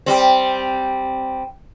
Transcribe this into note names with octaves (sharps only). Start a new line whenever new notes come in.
G3 C4